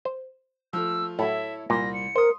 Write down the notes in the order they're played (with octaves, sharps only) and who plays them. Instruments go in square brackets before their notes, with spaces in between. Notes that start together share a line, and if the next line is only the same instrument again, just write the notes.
[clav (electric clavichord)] C5
[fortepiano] F3 A3 [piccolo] E6
[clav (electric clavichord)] A2 F#3 [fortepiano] E4 A4 C#5 [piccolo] E5
[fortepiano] C2 C6 [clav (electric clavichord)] A#2 [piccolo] A#6
[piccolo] C#7
[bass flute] A#4 [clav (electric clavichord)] C5 [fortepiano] C6 D#6